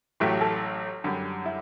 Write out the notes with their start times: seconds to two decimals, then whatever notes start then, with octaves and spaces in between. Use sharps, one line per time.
0.20 A1 A2 F#3 A3 G4
0.41 A4
1.04 F#2 D3 G3
1.46 E4